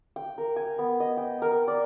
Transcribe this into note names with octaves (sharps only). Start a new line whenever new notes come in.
G5
A#4
G#5
B3
D#5
G5
A#4
D5